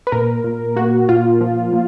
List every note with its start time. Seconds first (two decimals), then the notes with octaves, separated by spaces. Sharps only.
0.07 B4
0.12 A#2 A#4
0.44 A#2
0.76 A#3 F#4
1.09 A#2 F4
1.41 F3
1.73 A#2